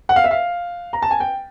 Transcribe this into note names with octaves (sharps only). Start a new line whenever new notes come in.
F#5
F5
E5
F5
A#5
A5
G#5
G5